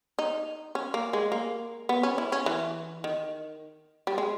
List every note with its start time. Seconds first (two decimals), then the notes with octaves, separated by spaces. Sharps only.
0.19 D#4
0.75 C#4
0.94 A#3
1.13 G#3
1.32 A#3
1.89 B3
2.03 C#4
2.18 E4
2.32 C#4
2.46 E3
3.04 D#3
4.07 G3
4.18 G#3